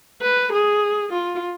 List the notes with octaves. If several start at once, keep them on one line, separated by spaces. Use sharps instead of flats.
B4
G#4
F4